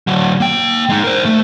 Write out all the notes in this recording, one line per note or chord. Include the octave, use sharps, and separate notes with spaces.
D3 F#3
A#3 G5
G#3 D#4
A#4 C5
A3